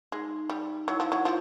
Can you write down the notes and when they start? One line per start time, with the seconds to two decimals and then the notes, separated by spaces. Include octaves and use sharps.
0.12 G#3 D#4
0.50 G3
0.87 F#3 E4
1.00 F3
1.12 F#3
1.25 F3 F4